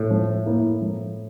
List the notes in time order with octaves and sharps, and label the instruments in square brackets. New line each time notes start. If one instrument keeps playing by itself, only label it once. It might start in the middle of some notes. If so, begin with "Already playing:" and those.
Already playing: [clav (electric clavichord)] A2
[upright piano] F3
A#3 E4 A#4
F3